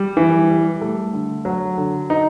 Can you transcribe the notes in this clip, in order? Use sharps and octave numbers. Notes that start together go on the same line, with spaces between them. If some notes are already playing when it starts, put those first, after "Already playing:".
Already playing: G3
E3
G3
A3
D3
F#3
D3
D#4